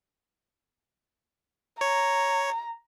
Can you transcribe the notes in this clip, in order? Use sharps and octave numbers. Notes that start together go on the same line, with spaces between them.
C#5 A#5